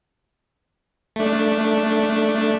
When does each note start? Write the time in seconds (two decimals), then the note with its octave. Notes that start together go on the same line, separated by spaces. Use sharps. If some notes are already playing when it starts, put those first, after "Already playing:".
1.16 A3 D4